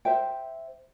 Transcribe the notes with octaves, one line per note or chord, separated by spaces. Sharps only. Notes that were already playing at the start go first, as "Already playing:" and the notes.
C5 E5 G5